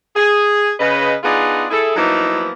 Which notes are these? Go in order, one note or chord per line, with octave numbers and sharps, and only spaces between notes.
G#4
C#3 B4 D#5
B3 D4 D#4 F4 G#4
E4 G#4 A4
F3 F#3 A#3 B3 D#4 E4